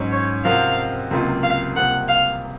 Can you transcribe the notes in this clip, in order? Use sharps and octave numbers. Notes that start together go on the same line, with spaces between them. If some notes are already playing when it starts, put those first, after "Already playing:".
Already playing: G#2 F#3 C#4
C#5
C3 F3 C4 F#4 A#4 F5
C#2 C3 F#3 A#3 F4
F5
C2 C3 F3 A#3 F#5
F5